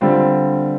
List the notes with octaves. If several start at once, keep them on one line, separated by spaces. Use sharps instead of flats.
D3 G3 C4 F4